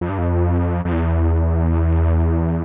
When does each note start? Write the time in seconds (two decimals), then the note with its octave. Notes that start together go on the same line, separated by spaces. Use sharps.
0.01 F2
0.09 G2
0.18 F2
0.85 F2
0.92 E2